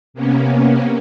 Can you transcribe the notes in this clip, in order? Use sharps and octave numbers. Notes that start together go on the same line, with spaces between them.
C3 A#3 B3 C#4